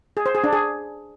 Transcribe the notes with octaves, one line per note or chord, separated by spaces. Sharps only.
G#4
C5
G#4
D4
G#4